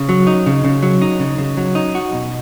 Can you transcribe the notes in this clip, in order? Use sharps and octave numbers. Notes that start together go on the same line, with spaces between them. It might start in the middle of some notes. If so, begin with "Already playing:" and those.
Already playing: C#3
F#3
D#4
C#3
C#3
F#3
D#4
C#3
C#3
F#3
D#4
F#4
B2